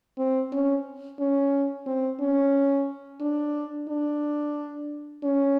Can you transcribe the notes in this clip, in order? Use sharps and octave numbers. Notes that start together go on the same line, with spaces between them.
C4
C#4
C#4
C4
C#4
D4
D4
C#4